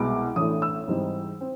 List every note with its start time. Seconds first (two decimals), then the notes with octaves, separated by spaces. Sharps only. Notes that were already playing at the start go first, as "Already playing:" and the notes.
Already playing: C2 B2 G#3 B3 D6
0.36 A1 A2 E3 A3 D4 D#6
0.62 E6
0.88 G#2 E3 G3 C4 D#4
1.41 C4